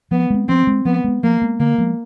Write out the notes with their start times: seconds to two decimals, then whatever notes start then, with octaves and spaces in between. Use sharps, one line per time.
0.11 F3 B3
0.30 G#3 C4
0.49 F3 C4
0.67 G#3 C4
0.85 F3 B3
1.04 G#3 B3
1.23 F3 A#3
1.42 G#3 B3
1.60 D3 A#3
1.78 F3 G#3 B3